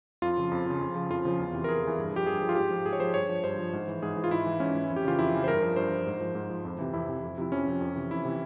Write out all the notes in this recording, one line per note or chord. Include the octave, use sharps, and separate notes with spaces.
F2 F4
C#3 F3
F2
C#3 F3
F2
C#3 F3
F2 F4
C#3 F3
E2
C3 E3
A#4
E2 G#4
C3 E3
G2
F3 G4
G2 G#4
F3
F4
G#2 G4
F3
G#2 G#4
C#5
F3 C5
G2 C#5
F3
G2 C5
F3
G#2
E3
G#2 G#4
E3
F4
G#2 E4
E3
G#2 C#4
E3
F2
G4
C#3 E3 F4
F2 E4
C#3 E3
C5
G2 A#4
F3
G2 C5
F3
G#2
F3
G#2
F3
F2
C3 E3
F2 E4
C3 E3
F2
C3 F3 E4
F2 C#4
C3 F3
F2
C3 E3
F2 E4
C3 E3